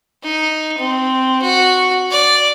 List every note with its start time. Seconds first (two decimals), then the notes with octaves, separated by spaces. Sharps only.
0.24 D#4
0.78 C4
1.42 F#4
2.11 D5